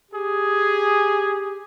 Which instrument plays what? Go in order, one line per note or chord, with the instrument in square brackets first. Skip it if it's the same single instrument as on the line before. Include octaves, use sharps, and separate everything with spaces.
[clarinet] G4 [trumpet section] G#4